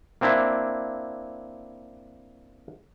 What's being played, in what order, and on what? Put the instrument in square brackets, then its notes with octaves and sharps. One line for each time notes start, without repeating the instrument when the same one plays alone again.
[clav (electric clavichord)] A#3 C4 D4 E4